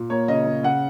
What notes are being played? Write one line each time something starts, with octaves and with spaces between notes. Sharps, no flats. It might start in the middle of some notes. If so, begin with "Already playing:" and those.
Already playing: A#2
A#3 C#5
C#3 D#5
C#3
C#3 F#5